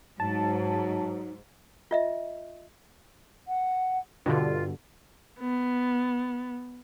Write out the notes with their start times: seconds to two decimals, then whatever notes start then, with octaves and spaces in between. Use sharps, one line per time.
0.20 G#2 F#3 D#4 A5
1.91 F4 D#5 E5
3.47 F#5
4.26 G2 B2 D3 F4
5.39 B3